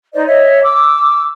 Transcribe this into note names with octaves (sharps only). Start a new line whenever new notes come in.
D#4 C5 D5 D#5
C#5 D#5 E5
D6 E6